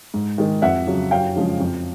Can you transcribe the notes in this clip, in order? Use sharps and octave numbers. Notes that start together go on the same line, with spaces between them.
G#2
D#3 G#3
F2 E5 F#5
C#3 F#3
F#2 F5 G5
C#3 F3 G#3
F2